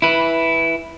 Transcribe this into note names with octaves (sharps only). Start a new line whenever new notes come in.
E4 B4